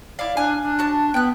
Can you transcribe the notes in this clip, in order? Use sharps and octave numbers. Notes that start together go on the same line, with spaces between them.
E4 D5 F5
D4 G#5 F6
D4
F#4 A5
B3 G5 F#6